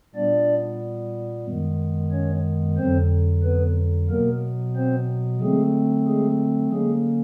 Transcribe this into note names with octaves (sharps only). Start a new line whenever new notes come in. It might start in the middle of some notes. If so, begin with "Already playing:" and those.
A#2 G3 B3 D4 D5
F#2 D#3 G#3 B3
C#4 C#5
F2 D3 F#3 C4 C5
B3 B4
B2 F#3 A#3 B3 A#4
C4 C5
D3 F#3 G#3 A3 C4 G#4
G#3 G#4
D3 F#3 G#3 A#3 C#4 G#4